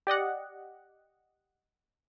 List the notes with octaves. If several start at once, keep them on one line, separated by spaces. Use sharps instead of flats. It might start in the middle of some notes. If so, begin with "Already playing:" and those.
G4 D5 D#5 F#5